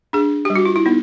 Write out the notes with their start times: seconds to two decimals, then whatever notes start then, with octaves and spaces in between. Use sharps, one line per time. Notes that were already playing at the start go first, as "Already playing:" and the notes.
0.13 D4 G#4
0.45 G3 G4
0.56 F#4
0.65 F4
0.76 E4
0.86 B3 D#4